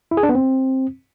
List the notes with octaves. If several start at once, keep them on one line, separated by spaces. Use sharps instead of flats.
E4
G#4
D4
B3
C4